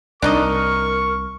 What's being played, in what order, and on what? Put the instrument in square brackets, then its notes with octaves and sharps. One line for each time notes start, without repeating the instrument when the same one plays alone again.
[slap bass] C2 [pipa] D4 D#4 D#5 [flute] A#4 [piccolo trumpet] C#6